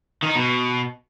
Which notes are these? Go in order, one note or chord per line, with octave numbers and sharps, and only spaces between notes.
D#3
D#4
B2